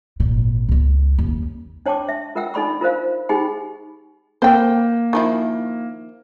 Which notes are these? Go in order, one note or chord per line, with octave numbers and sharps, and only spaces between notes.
G#1 A#2
C#2 G#3
D#2 C#4
D4 C#5 G5 A5 C#6 D6
E5
F4 A#4 E5 F#5 G5 E6
D4 D#4 A4 D5 B5 C#6
F4 A#4 C5 F5
D#4 G4 G#4 G5 B5
A#3 C5 G5
D#3 F3 E4